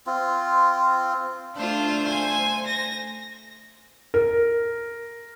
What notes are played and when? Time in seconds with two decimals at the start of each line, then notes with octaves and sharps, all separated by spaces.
0.06 C4 F4
1.57 A3 D4 F4 C5
2.08 G#5
2.67 A#6
4.14 A#4